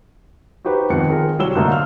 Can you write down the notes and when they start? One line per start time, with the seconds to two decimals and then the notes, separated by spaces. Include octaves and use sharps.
0.65 D#4 F#4 G4 B4 C5
0.90 F2 G#2 D#3 B3 C#7
1.10 D#3 C4 F4 G#4 A#4
1.39 C2 F#3 G3 E6 E7 G7
1.55 G#2 D3 A3 A#3 D#4
1.72 F5 F6